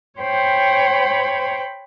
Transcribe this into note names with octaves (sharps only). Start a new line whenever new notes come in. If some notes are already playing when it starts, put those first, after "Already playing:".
C5 C#5 G5 B5